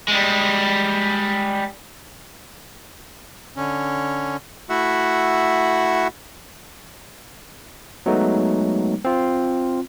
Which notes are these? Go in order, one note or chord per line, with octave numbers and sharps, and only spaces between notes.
G3 G#3
D3 C#4
A3 E4 F#4 E5 F#5
F#3 G#3 A3 B3 D#4
C4 F4